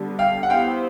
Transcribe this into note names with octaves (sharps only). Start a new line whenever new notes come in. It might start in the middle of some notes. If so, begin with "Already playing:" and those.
Already playing: D3 G3 B3
F5 G5
F#5
B3 E4 G4 C5 F5 G5